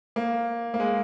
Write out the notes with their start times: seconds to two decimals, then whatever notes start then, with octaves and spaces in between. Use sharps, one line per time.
0.16 A#3
0.74 A#3
0.80 G#3